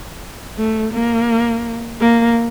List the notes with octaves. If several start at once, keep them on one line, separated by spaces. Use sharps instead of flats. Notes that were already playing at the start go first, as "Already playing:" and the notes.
A3
A#3
A#3